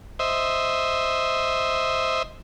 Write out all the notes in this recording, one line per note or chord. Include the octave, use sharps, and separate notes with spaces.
C5 D#5 E5